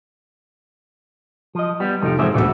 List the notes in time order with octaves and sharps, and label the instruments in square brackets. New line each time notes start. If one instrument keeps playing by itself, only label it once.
[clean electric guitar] F3 D#5
G3 B3
[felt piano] F1 [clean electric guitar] F3 D#4 G4
[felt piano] G#2 C4 [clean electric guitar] E3 F3 E5
[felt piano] D#1 D2 E6 [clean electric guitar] B3 D4 A4